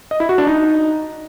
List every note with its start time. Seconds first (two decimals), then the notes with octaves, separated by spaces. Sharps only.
0.11 D#5
0.20 E4
0.29 F#4
0.38 D4
0.47 D#4